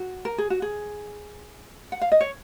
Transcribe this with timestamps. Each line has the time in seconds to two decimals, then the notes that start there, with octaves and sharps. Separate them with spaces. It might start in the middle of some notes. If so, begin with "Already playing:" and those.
Already playing: F#4
0.25 A#4
0.38 G#4
0.50 F#4
0.62 G#4
1.92 F#5
2.01 F5
2.12 D#5
2.21 C#5